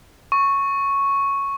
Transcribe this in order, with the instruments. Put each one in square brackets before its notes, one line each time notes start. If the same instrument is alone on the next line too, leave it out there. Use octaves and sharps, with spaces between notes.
[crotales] C#6